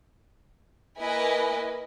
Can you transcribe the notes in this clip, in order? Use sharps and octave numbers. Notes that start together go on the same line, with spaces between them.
A#3 E4 B4 D#5 G#5